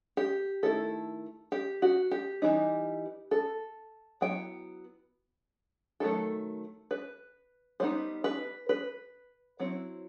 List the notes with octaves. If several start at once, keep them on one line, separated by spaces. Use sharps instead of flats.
G4
D#3 A3 E4 A4
G4
F#4
G4
E3 G3 D#4
A4
F#3 B3 E4 G5
D#3 F#3 A3 A4
B4
G3 B3 D#4 C5
B4
B4
F#3 C4 E4